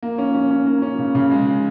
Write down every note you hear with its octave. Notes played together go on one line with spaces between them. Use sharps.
A#3
C#4
C#4
C#4
A#3
C#4
C#3
C#3
G#3
G#3